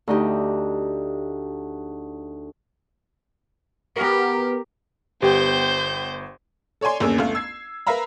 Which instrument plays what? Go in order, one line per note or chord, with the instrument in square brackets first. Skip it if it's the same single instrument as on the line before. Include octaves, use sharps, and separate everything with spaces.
[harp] D2 D#4 G4
[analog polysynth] B3 A#4 [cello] G4
[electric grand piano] G1 B3 G5 [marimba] G4 [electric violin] C5 G6
[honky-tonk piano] A4 C#5 D5 G#5 C6
G1 D#2 A#3 C#4 G#4 E6
G1 A3 F5
E6 G#6 C7
A#4 B4 E5 F5 A#5 B5